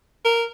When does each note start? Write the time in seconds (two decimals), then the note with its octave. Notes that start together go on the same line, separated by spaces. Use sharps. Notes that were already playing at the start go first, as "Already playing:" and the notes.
0.25 A#4